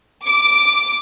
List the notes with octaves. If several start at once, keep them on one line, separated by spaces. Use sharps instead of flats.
D6